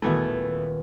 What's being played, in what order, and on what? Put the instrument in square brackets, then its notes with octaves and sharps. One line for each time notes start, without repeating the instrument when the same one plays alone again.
[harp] D#1 B3 G#6 [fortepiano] B2 E3 A3